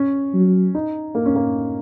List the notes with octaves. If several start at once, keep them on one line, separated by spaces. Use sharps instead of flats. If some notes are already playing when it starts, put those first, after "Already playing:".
Already playing: C#4
F#3
D#4
A#3
C#4
A#3